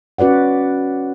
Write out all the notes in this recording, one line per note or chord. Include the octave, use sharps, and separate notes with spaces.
C#4 F#4 B4 D5 F#5